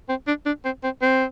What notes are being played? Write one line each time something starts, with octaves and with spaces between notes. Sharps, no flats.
C4
D4
D4
C4
C4
C4